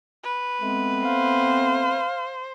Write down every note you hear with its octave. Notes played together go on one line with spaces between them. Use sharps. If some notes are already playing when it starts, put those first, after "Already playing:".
B4
G#3 A3 B3 C4
C5 F5